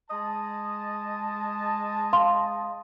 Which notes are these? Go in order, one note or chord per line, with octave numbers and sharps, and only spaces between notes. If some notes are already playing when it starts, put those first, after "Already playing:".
G#3 D#5 A5
F5 C6